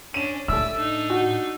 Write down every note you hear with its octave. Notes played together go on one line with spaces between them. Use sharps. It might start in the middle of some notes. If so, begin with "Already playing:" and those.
C#4 D4 D#7 E7
A2 A4 D5 E5 E6
D4 D#4
F#4